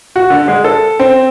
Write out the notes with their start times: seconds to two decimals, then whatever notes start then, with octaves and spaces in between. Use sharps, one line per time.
0.16 F#4
0.30 D3
0.48 G#3
0.64 A4
1.00 C4